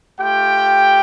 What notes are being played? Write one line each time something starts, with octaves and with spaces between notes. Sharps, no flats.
A3 F4 G4 G5